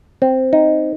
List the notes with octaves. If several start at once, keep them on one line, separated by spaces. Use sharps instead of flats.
C4
D#4